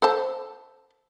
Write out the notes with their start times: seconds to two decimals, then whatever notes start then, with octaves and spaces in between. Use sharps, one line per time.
0.02 A4 C5 A5